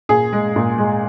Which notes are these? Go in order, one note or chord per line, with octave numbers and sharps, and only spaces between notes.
A#2 G#4
G#3
A#2
G#3